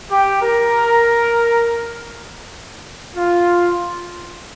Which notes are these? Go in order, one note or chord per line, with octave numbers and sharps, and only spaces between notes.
G4
A#4
F4